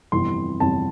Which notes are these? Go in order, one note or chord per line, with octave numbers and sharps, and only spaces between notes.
G1 F2 C3 E3 C6
G1 F2 C3 E3 A5